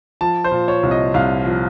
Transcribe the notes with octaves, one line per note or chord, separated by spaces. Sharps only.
F3 A5
C5
A#2
C#5
C2
D#5
C2 F5
F3